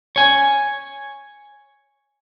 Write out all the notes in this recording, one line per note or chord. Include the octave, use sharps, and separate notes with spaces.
C#5 G#5